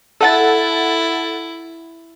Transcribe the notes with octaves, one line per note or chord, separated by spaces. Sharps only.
E4 A4 F#5 A6